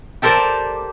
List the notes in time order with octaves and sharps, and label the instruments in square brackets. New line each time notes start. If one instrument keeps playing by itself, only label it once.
[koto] G4 A4 A#4 C5 D5